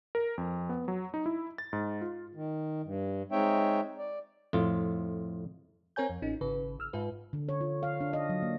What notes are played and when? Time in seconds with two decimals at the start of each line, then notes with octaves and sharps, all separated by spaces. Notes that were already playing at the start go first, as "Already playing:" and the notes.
0.15 A#4
0.38 F2
0.69 B3
0.88 F#3
1.14 D#4
1.26 E4
1.58 A6
1.73 G#2
2.01 F4
2.34 D#3
2.84 G2
3.32 G#3 C4 D#4 C#5 E5 G5
3.98 D5
4.53 F2 A2 F4
5.96 C4 A#4 C#5 G#5 G6
6.10 F2
6.22 A1 C#4 D#4
6.41 G#1 C#3 B4
6.79 G#1 E6 F6
6.93 G#2 F4 B4
7.33 D3
7.49 C#5
7.61 F4
7.83 F5
8.01 D4
8.13 D#5
8.29 F#3
8.42 A#3